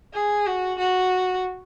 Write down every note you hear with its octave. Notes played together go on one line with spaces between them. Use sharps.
G#4
F#4
F#4